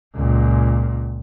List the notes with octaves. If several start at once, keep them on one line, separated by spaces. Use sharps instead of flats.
C#2 A#2